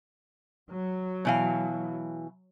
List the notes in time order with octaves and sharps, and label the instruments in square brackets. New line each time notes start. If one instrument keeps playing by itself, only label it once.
[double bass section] F#3
[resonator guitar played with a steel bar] B2 E3 F5